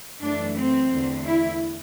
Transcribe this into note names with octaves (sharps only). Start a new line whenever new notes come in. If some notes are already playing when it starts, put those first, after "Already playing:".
F#2 E3 A3 D4
C4
E2 D3 A3
E4